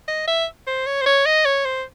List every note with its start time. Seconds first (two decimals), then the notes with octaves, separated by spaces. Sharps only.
0.08 D#5
0.28 E5
0.67 C5
0.86 C#5
1.01 C5
1.06 C#5
1.26 D#5
1.45 C#5
1.65 C5